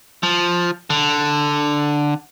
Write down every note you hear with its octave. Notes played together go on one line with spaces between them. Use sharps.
F3
D3